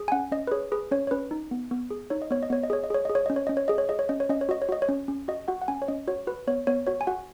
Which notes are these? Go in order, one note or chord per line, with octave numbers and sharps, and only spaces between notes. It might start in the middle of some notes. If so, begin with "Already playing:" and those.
Already playing: G#4
G#5
C#4 F#5
C#4 D#5
B4
G#4 C#5
G#4 B4
C#4 C#5
C#5
C#4 B4
D#4
B3
B3
G#4
D#4 C#5
D#5
B3 C#5
D#5
B3 C#5
D#5
G#4 C#5
D#5
G#4 C#5
G#4 D#5
C#5
C#4 D#5
C#5
C#4 D#5
C#5
G#4 D#5
C#5
G#4 D#5
C#5
C#4 D#5
C#5
C#4 D#5
C#5
F#4 D#5
C#5
F#4 D#5
C#5
C#4
C#4
F#4 D#5
F#4 F#5
F#5
C#4 G#5
C#5
C#4 D#5
F#4 C#5
F#4 B4
B3 C#5
B3 C#5
F#4 C#5
G#5
F#4 F#5